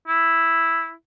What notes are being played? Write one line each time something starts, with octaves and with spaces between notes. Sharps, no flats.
E4